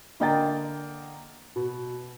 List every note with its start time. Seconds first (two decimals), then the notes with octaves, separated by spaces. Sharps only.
0.20 D3 A#3 D#5 G5 A#5 A6
1.56 B2